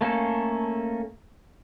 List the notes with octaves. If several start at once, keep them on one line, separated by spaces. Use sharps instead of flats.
A3 A#3 C#4 A4